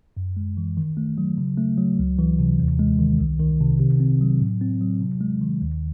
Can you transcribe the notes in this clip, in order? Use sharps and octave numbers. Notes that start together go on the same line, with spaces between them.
F#2
G#3
E3
D#3
A3
F#3
C#3
A3
F#3
C#2
E3
C3
D#2
G#3
D#3
C2
D#3
C3
C3
C4
F#3
A2
C4
F#3
C3
G#3
D#3
D#2